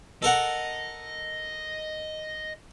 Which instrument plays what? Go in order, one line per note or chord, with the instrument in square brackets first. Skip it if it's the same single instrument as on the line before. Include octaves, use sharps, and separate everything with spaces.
[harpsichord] A4 A#4 F#5 [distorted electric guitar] D#5